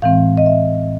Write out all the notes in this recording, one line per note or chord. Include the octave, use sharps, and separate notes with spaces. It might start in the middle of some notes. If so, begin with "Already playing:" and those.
A2 E3 G#3 C4 F5
D#5
E5